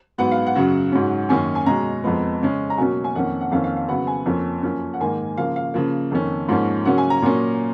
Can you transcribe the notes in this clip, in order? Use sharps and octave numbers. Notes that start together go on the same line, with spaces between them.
G#2 F#3 B3 F#5
F5
F#5
F#2 C#3 F#3
G#2 F#3 C#4
F#2 D#3 A#3 C#4 G#5
G#5
B2 G#3 C#4 A#5
F2 F3 G#3 B3
C#3 G#3 C#4
A#5
B2 F#3 A#3 C#4 G#5
G#5
F2 D#3 A#3 C#4 F#5
F#5
F2 D#3 A#3 C#4 F5
F5
F5
C#3 F#3 B3 F#5
G#5
F2 F3 A#3 C#4
F#2 F3 A#3 C#4
F#5
G#2 D#3 A#3 G#5
C#3 F3 A#3 F5
F5
C#3 F3 A#3
F2 D#3 A#3 C#4
G#2 F3 A#3 C#4
C#3 F#3 A#3 C#4 F#5
G#5
A#5
A#2 F#3 A#3 C#4